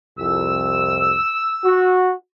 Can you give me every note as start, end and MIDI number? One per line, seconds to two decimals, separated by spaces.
0.18 1.17 36
0.18 1.17 41
0.18 1.93 88
1.63 2.12 66